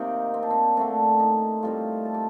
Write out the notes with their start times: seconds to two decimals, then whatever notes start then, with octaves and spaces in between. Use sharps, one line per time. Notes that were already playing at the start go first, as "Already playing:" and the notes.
Already playing: C3 D#3 A#3 C4 D#4 G4
0.34 C4
0.43 D4
0.50 C4
0.77 D3 A3 C4 D4
1.20 D#4
1.63 A2 G3 C4 F4
2.05 A4
2.14 G4